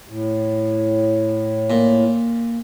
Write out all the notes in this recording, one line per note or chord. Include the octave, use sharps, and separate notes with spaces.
A2
A#2